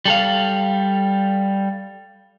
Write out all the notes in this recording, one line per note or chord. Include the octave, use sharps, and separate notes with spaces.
G3 A4 F5